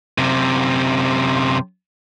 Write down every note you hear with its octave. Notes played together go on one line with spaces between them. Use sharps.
F#2 C3